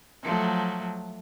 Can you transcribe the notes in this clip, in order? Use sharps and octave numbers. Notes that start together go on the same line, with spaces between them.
F3 F#3 A3